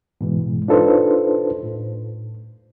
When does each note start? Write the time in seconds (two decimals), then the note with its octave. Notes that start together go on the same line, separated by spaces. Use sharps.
0.21 G#2 B2 E3 G#3
0.68 D4 D#4 F4 A4 B4 C5
1.63 A2